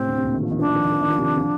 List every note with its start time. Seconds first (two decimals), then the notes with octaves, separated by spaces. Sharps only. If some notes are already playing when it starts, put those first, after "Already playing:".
Already playing: A2 C3 C4
0.09 D3
0.17 C3
0.25 A#2 D3
0.34 D#3
0.43 F3
0.51 D#3
0.59 F3 D4
0.68 D#3
0.76 F3
0.85 D#3
0.92 F3
1.01 D#3
1.10 F3
1.18 C3 D#3
1.37 D3 F3